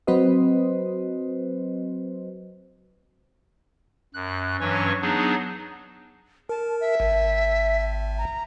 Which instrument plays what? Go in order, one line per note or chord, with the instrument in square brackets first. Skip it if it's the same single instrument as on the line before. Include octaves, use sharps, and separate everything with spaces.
[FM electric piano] F#3 C4 F#4 B4 C5 D#5
[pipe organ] F#2 F#6
G2 E3 F#3 C#4 C#5 C#6
F#3 B3 D4 D#4 G#4
[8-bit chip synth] A#4 [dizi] A5
[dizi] E5
[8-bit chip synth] G#1
[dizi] A#5